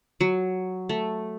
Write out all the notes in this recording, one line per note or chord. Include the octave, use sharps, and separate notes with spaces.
F#3
A3